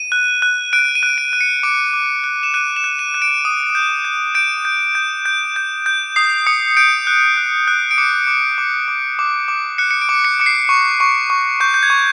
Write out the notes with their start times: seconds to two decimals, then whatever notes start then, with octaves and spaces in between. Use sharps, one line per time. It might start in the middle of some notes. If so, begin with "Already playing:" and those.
Already playing: D#7
0.12 F#6
0.42 F#6
0.73 F#6 D7
0.95 D#7
1.03 F#6
1.18 D7
1.33 F#6
1.41 C#7
1.63 D6 D7
1.93 D6
2.24 F#6
2.43 E7
2.54 F#6 D#7
2.76 E7
2.84 F#6
2.99 D#7
3.14 F#6
3.22 D7
3.45 D#6
3.75 G6
4.05 G6
4.35 G6 D7
4.65 G6
4.95 G6
5.26 G6
5.56 G6
5.86 G6
6.16 D#6 C7
6.47 D#6 C#7
6.77 G6 D7
7.07 F#6
7.37 F#6
7.68 F#6
7.91 D7
7.98 D6 C#7
8.27 D6
8.58 D6
8.88 D6
9.19 D6
9.48 D6
9.78 F#6 C#7
9.91 C#7
10.01 D7
10.09 D6
10.25 C#7
10.40 D6 C#7
10.46 C7
10.69 C#6
11.00 C#6
11.30 C#6
11.60 C#6 G6
11.74 G6
11.83 G#6
11.90 C#6